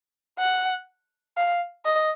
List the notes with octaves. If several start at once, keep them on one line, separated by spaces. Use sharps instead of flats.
F#5
F5
D#5